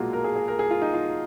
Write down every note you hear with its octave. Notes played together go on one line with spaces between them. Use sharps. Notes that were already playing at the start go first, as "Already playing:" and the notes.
Already playing: B1 A#2 F#3 G#3 A#3 F4 F#4
A#4
G#4
G#4
A#4
G#4
F4
D#4
F4